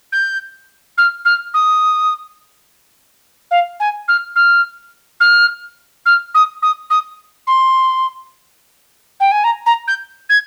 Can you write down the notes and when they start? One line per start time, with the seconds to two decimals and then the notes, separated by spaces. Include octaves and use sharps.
0.12 G6
0.98 F6
1.25 F6
1.54 D#6
3.51 F5
3.80 G#5
4.08 F6
4.36 F6
5.20 F6
6.06 F6
6.34 D#6
6.62 D#6
6.90 D#6
7.47 C6
9.20 G5
9.32 G#5
9.44 A#5
9.66 A#5
9.88 G6
10.29 G#6